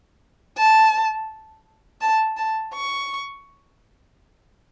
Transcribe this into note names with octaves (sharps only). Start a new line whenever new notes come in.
A5
A5
A5
C#6